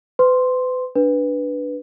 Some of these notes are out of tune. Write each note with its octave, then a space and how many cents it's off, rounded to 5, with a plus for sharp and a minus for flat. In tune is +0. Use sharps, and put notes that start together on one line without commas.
B4 +40 C6 +0
D4 +0 B4 +0